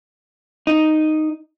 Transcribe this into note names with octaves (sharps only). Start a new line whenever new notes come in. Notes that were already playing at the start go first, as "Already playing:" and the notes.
D#4